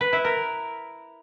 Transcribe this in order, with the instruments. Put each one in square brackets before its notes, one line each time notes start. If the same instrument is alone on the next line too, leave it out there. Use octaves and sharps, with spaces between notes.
[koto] B4
E4
A#4